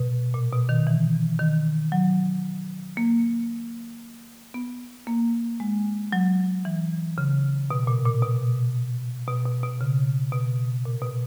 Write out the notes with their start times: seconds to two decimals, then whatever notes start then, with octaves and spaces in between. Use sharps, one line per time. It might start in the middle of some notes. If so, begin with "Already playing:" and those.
Already playing: B2
0.34 A#2
0.53 B2
0.69 D#3
0.87 E3
1.39 D#3
1.92 F#3
2.97 A#3
4.54 B3
5.07 A#3
5.60 G#3
6.13 F#3
6.65 E3
7.18 C#3
7.71 B2
7.87 A#2
8.05 A#2
8.22 B2
9.27 B2
9.45 B2
9.63 B2
9.81 C#3
10.32 B2
10.85 A#2
11.02 B2